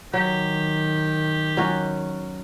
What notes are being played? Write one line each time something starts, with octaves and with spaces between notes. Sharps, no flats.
D#3 F#3 G4
F#3 C#4 F#4